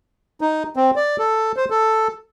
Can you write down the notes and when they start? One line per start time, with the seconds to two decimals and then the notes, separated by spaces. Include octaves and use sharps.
0.41 D#4
0.76 C4
0.96 D5
1.19 A4
1.57 C5
1.70 A4